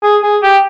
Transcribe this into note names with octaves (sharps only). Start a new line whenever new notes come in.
G#4
G#4
G4